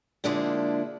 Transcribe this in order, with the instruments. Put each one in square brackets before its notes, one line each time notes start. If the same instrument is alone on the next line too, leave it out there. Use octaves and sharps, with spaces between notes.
[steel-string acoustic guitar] D3 F3 G#3 A#3 D4 E4